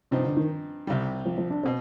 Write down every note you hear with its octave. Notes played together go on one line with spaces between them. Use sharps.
G2 C3 F3 C4 D#4
D3
D#3
C2 C3 G3
F3
F3
D4
B2 C4